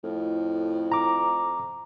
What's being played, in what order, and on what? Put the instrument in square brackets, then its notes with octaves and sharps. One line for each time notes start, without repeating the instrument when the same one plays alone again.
[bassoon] F2 [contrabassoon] A2
[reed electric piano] A#5 D6